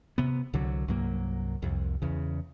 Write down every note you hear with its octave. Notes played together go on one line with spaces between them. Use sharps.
C3 B3
C2 D3 F#3
C2 G2 F#3 A#3
C2 F2
E2 C#3